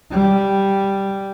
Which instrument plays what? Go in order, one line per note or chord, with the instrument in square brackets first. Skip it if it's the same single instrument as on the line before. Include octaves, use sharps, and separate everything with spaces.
[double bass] G3